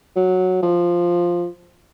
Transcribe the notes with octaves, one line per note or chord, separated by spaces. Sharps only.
F#3
F3